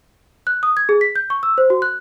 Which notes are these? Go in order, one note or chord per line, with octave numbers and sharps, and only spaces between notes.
F#6
D#6
G#6
G#4
B6
G6
C#6
E6
C5
F#4
F#6